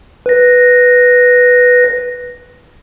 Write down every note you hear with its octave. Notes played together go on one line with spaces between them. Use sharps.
B4 A#6